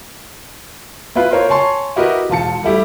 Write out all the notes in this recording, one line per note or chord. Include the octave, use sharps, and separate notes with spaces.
B3 E4 F4 B4
F4 A#4 C5 C#5
C#5 G#5 A5 C6 C#6
E4 F#4 G4 A#4 B4 D#5
E1 F4 A5 C#7
G3 A3 E4 G4